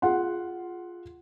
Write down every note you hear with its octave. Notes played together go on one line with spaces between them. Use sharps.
F4 G#4 F#5 C6